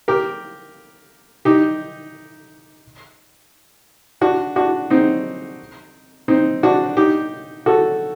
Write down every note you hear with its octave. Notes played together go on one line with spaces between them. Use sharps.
G4 A#4
D#4 G4
D4 F#4
D4 F#4
C4 D#4
C4 D#4
D4 F#4
D#4 G4
F#4 A4